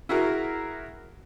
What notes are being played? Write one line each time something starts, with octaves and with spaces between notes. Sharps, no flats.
E4 F#4 G#4 A#4